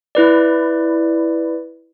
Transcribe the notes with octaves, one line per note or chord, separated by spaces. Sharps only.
E4 B4 D5